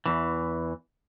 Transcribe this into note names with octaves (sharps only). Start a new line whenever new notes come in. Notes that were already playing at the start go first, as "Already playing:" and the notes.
E2 E3